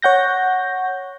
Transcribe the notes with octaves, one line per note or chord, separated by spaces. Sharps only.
C#5 F#5 G6 A#6